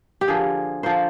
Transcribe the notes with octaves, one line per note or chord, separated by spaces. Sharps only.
G4
D3 F3 A#3 G#4
D3 F3 A#3 C5